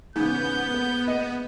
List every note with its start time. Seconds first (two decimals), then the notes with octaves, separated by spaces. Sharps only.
0.16 G#2 C#3 E3 B3 G6
0.74 B4
1.08 D#5